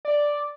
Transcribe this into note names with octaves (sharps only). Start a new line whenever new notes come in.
D5